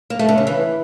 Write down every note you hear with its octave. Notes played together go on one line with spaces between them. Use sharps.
A#3
A3
D3
C#3
E3